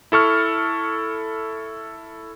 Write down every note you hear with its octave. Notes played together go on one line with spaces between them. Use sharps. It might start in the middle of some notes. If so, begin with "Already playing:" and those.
E4 A4 C#6 F6